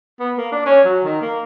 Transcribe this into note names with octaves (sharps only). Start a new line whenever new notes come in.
B3
A#3
D4
C#4
F#3
D#3
A#3